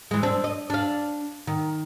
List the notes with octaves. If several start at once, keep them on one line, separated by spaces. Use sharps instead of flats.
E3 G#3
C4 D4
D#5
D4 F5
D#3